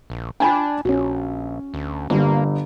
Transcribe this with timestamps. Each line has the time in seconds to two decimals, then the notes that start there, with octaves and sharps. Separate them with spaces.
0.10 A#1
0.40 D4 G5 G#5 B5
0.85 A#1 C#4 F#4
1.74 D2
2.10 G1 G3 A#3